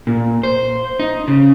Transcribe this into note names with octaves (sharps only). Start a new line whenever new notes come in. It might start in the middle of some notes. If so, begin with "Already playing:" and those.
A#2
C5
D#4
C#3